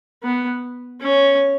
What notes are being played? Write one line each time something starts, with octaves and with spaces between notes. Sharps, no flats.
B3
C#4